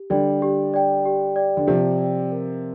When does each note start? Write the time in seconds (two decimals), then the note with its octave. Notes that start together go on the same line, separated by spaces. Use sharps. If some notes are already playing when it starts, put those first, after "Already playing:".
Already playing: G4
0.10 D3 G3 D5 G5
0.42 G4
0.74 D5 G5
1.05 G4
1.36 D5 G5
1.57 D3
1.67 C3 F3 G4
1.99 D5 G5
2.31 A#4